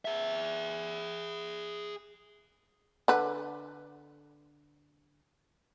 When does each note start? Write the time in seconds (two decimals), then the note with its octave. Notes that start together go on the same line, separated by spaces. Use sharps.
0.05 G#4 E5
3.08 D3 B4